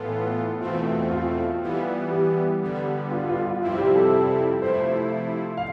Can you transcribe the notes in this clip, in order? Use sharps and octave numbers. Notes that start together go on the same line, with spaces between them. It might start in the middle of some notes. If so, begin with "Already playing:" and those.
Already playing: A2 E3 B3 F4 A4
E2 B2 A3 C4 F4
F4
E3 G3 B3
G4
D3 G3 B3
F4
F4
F4
F2 C3 G3 C4 E4 F4
G4
A4
C3 F3 A3 E4 C5
F5